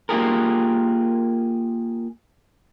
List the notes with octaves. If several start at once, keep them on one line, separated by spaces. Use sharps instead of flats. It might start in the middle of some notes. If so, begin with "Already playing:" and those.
A#3 F4 G4 G#4 A#4